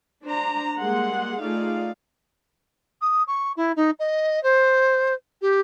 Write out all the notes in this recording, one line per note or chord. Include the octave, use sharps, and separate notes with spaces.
D4 C5 A#5
G3 G#3 A#3 F#5 C6
A3 D#4 F4 G#4 D5 F5
D#6
C#6
E4
D#4
D#5
C5
G4